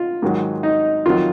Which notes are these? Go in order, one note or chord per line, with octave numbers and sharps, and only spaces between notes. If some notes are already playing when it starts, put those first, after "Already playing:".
Already playing: F4
G#2 D#3 F#3
D#4
F2 D#3 F#3 F4